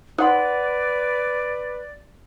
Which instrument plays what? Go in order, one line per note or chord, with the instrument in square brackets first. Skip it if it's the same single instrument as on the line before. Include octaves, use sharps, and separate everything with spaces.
[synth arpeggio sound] D#4 [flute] B4 [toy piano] C5 F#5 C6 [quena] D5